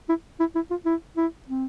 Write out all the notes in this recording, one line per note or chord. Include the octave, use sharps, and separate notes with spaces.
E4
E4
E4
F4
E4
E4
C4